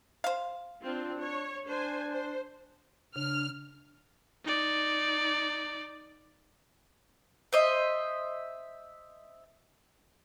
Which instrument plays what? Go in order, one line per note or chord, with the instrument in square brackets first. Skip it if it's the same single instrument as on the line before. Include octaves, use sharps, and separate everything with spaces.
[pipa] C5 F5
[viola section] C4 F4 [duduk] D4
[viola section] C#5
[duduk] D4 [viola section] C5 G#5
[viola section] C5
[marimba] C#3 [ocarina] D4 [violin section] F6
[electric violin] D#4 D5
[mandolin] C5 D#5 E5